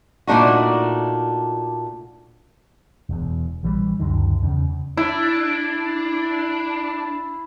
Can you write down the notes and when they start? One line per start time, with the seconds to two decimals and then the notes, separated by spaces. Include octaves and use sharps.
0.27 A#2 A3 D4 D#4 F#4
3.09 E1 E2
3.63 A#1 E3 G3
4.00 C#2 F#2 D3 D#3
4.42 E2 C#3
4.97 D4 E4